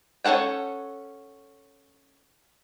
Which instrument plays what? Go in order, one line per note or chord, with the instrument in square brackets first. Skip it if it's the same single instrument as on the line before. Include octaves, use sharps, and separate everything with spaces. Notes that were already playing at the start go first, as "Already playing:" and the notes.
[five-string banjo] C#4 F4 A4 F#5 G5